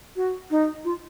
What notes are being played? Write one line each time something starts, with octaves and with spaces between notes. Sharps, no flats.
F#4
D#4
F4